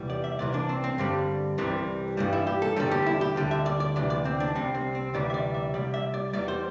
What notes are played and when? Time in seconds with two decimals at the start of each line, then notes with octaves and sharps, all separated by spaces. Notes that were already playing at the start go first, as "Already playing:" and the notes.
Already playing: E2 C3 E3 G3
0.10 D5
0.24 E5
0.39 C2 C3 E3 D5
0.54 D4
0.69 C4
0.84 C4
0.98 G2 D3 G3
1.58 C2 C3 E3 G3
2.17 G2 E3 G3
2.33 E4
2.47 G4
2.62 A4
2.76 E2 D3 G3 A4
2.91 G4
3.06 E4
3.21 G4
3.36 D2 D3 G3
3.51 E5
3.66 D5
3.80 D5
3.96 D2 C3 E3 D5
4.10 D5
4.25 C4
4.40 D4
4.55 C2 C3 G3 C4
4.74 C4
4.95 C4
5.14 D2 C3 E3 G3 D5
5.30 E5
5.34 D5
5.54 E5
5.74 C2 C3 G3 D5
5.94 E5
6.14 D5
6.33 E2 E3 G3 D5
6.48 C5